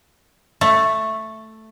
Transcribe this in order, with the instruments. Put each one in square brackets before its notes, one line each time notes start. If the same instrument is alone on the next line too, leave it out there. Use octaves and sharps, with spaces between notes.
[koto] A3